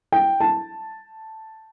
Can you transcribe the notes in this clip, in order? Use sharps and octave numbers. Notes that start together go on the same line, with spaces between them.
G5
A5